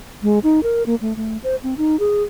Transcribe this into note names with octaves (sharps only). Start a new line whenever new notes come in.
G#3
D#4
A#4
A#3
A3
A3
C5
C4
D#4
G#4